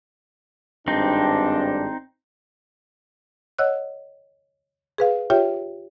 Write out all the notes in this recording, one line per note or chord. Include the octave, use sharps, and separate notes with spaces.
G#1 G2 C4 D4 D#4
C#5 D#5 F#5 E6 F#6
G#4 B4 F5
F4 G4 C#5 E5 G5